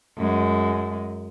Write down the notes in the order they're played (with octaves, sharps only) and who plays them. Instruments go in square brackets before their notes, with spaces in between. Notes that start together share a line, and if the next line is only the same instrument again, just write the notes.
[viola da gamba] F#2 G#3